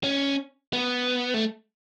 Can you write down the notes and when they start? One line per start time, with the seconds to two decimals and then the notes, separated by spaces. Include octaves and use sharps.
0.04 C#4
0.73 B3
1.34 A3